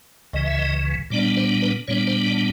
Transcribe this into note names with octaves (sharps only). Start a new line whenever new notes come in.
C#2 C#3 E3 D#5
E5
D#5
A#2 G3 B3 D4 D5
C5
B4
A#2 G3 B3 D4 C#5
C5
D5